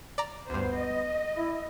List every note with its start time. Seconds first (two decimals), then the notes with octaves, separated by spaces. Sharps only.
0.18 D5 A#5
0.50 D2 G2 B3 C5
0.79 D#5
1.37 E4